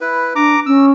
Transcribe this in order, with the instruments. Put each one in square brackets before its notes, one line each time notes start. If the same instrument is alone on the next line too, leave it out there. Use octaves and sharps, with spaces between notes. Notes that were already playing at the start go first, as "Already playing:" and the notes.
[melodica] E4 B4
[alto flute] D4 [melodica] A#5 D6
[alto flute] C#4 [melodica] E6